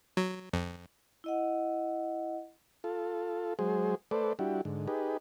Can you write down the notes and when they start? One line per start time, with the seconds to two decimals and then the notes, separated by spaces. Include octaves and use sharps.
0.17 F#3
0.53 F2
1.24 E4 D#5 F#5
2.84 F4 A4
3.59 F#3 G#3 G#4 C5
4.11 A3 A4 B4 C5 D5
4.39 G3 D4 E4 F#4 G4
4.65 G#2 D3
4.88 D#4 G4 G#4 B4